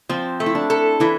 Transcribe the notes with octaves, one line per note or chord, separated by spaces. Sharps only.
F3 C4
A3
E4
D4
A4
E3 E4